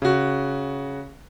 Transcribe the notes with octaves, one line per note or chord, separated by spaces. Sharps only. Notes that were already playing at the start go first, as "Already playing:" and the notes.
C#3 F#4